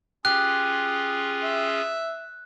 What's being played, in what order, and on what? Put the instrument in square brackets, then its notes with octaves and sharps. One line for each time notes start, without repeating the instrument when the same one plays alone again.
[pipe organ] C#4 F4 G#4 [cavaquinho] G4 [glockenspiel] F#6
[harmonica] E5